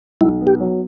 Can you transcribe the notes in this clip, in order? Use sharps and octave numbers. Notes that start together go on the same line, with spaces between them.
B1 E4
B3
G4
F#3